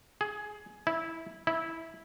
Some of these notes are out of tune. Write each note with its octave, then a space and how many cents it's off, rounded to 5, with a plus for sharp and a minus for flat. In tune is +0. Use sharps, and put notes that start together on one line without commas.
G#4 +15
E4 -15
E4 -15